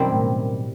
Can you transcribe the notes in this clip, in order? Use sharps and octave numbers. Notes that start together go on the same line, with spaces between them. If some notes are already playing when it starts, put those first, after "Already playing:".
Already playing: F#2 B2 D#3 G3 C4 E4
A2
B2